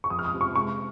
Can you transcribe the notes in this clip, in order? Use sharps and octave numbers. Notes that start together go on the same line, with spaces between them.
C#6
F2 D#6
F6
D#6
C3
C#6
G#3 C#6